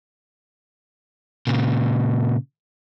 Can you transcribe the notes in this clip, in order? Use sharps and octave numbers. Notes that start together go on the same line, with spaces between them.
A#2 C#3